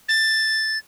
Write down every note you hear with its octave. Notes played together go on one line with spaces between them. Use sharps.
A6